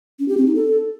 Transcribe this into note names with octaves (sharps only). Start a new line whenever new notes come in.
C#4
G4
C4
D#4
A4